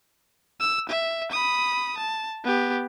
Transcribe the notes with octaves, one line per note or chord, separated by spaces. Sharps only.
E6
E5
B5 D#6
A5
B3 G4